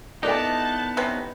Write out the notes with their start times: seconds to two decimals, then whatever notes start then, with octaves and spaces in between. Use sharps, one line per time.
0.23 B3 D#4 E4 A4 D5 A5 F#6
0.97 C3 C#4 B4